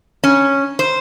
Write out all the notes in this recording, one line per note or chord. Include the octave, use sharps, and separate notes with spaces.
C#4
C5